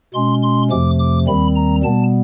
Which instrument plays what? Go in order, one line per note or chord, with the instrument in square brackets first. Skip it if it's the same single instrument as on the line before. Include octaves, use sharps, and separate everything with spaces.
[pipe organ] B2 G#3 C#4 C6
C6
F2 C3 F3 A3 D6
D6
D#2 D#3 G3 C4 B5
A#5
B2 G3 B3 A5